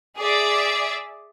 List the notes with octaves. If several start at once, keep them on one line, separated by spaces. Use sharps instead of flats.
G#4 D5 E5